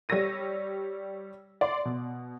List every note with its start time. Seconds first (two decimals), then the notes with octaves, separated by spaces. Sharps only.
0.09 G3 C#5 E6 A#6 D#7
1.61 D5 C6
1.85 B2